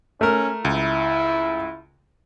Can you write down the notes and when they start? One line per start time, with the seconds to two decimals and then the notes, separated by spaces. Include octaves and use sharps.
0.21 A3 C#4 A#4
0.65 C#2 E4